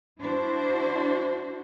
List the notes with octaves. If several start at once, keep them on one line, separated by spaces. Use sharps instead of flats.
D4 E4 F#4 C5